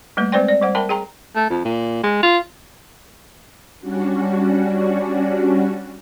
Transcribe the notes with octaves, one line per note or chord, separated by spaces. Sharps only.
G3 A3 A#3 B4
G#3 C4 B4 C5 D5 G5
D5
G3 C5 F#5
A#4 E5 G5 A5 B5
G#4 G5 A#5
A3
F2
A#2
G#3
F4
G3 C#4 D4 F#4